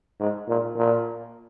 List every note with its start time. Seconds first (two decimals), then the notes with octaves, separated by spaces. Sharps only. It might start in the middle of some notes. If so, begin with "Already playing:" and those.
0.20 G#2
0.48 A#2
0.76 A#2